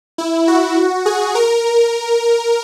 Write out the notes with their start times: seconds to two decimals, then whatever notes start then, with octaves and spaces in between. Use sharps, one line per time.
0.18 E4
0.48 F#4
1.06 G#4
1.35 A#4